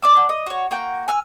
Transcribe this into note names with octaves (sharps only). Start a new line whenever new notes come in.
D5 D6 E6
D4 F#5
D#5
F#4 C#5
A#3 F#4 G5
G#5 E6 F6